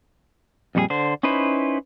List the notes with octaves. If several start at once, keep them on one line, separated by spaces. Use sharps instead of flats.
F2 A#2 G3 F#4 G#4
D3 C5
C#4 D#4 E4 B4 C5